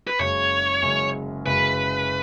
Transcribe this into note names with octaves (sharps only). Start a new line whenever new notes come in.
B4
F#1 F#2 C#3 G#3 C#5
F#1 F#2 C#3 G#3
F#1 F#2 C#3 G#3 B4